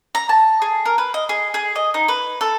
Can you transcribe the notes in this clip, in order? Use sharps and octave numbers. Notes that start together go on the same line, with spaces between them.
A#5
A5
G#4
A#4
B4
D#5
G#4
G#4
D#5
D#4
B4
A4